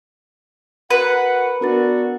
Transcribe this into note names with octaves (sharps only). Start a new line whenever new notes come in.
F#4 A#4 B4 F#5
B3 D4 F#4 A#4 A6